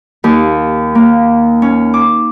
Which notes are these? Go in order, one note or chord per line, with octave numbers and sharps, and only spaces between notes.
D#2
A#3
C#4
D6